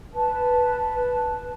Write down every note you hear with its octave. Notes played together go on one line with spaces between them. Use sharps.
B4 A5